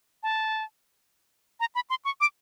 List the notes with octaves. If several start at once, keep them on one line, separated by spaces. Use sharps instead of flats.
A5
A#5
B5
C6
C#6
D6